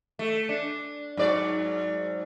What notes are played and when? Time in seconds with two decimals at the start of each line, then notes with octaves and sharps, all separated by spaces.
0.19 A3
0.49 D4
1.17 G#2 F#3 D5